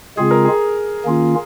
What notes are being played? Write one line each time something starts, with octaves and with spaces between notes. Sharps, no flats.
C#3 G#3 C4 F4 G#4
A#4
G#4
D#3 A#3 C#4 F4